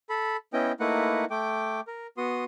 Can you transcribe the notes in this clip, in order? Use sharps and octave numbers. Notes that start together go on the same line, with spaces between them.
A4 B5
B3 C#4 E4 D#5 G5
A3 A#3 D#4 E4 B4 F#5
A3 G5 D6
A#4
B3 F#4 C6 D#6